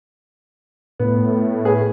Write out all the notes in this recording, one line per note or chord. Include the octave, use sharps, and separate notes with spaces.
A2 B3
G#4 B4